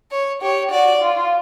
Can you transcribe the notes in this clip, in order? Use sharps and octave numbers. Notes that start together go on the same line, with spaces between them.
C#5
G4 C#5
F#4 D5
F4